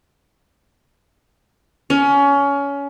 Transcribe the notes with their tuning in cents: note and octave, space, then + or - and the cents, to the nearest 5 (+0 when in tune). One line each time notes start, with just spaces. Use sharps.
C#4 +25